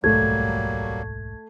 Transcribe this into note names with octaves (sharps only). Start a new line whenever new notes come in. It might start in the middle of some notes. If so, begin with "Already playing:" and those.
D1 B1 G#2 F#3 G3 A3 A#3 G#6